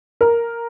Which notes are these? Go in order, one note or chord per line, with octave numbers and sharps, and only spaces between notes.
A#4